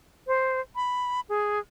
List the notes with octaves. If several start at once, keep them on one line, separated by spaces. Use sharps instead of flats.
C5
B5
G#4